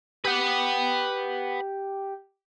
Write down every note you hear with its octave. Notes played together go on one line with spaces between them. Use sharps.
G4 B4 F#5